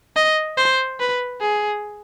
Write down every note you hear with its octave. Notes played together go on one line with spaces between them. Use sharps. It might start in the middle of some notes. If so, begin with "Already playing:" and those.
D#5
C5
B4
G#4